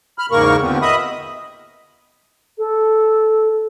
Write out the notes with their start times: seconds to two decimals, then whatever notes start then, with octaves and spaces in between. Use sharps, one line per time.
0.18 B5 F6
0.31 E2 G#2 C#3 A#3 A#4 C#6
0.61 D#2 D3 F3 B3 C4
0.82 D#5 E5 B5 D#6
2.58 A4